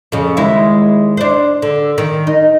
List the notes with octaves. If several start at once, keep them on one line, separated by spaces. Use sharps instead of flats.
F2 C#3
D#2 G#3 E4
D4 C5
D3
D#3
D#4